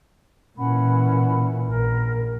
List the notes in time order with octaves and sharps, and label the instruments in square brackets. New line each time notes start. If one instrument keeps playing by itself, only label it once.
[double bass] A#2 E3 [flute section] C#4 F#5 B5
[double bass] A#1 [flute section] A#4